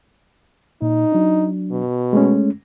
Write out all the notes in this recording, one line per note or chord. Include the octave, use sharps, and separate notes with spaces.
A#2 D#4
F#3 D4
B2
G#3 A3 C#4